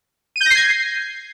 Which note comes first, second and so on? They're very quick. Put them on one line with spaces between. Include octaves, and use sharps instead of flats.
D#7 G6 A#6 C7 G#6